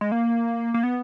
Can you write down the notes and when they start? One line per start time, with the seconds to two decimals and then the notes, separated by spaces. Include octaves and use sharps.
0.01 G#3
0.12 A#3
0.74 A#3
0.83 B3